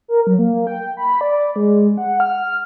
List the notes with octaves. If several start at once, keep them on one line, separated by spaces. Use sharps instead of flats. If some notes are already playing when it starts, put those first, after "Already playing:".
A#4
F#3
A#3
G5
B5
D5
G#3
F#5
F6